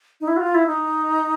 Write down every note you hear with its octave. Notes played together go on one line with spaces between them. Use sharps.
D#4
E4
F#4
F4
E4
D#4